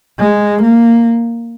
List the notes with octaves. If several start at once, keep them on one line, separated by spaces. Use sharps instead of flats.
G#3
A#3